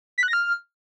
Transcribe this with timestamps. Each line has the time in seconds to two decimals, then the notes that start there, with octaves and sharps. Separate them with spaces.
0.18 B6
0.23 F#6
0.28 A#6
0.33 F6